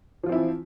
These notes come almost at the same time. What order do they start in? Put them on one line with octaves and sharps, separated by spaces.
F3 F4 C4 E4 E3